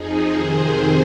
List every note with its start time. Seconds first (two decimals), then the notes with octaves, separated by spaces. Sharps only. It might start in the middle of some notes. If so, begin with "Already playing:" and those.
Already playing: F2 F3 D#4 G#4
0.32 F2 C3 D#3 G#4 C5